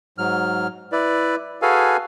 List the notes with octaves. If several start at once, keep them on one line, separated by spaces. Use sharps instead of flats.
G#2 F#3 F6
E4 B4 D5
F#4 G#4 A4 B4 F5 G#5